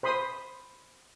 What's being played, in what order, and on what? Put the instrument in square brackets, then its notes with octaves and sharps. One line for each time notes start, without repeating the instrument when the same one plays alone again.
[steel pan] C5 B5 C6 D#6